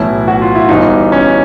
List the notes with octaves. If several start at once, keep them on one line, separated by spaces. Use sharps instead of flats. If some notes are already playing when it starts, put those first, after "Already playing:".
Already playing: B1 A2 E3 E4
F#4
F4
E4
G1 G2 E3 D#4
C#4